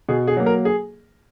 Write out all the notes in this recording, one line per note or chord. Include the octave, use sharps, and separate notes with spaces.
B2 G#4
G#4
F#3 A#3
A#4
G#4